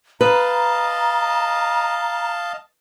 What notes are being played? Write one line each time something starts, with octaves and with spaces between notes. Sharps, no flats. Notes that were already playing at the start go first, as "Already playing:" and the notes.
B4 D#5 F5 A5 A#5